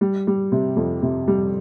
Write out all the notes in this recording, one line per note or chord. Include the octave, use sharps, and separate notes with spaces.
G3
G3
C3
F2
C3
G3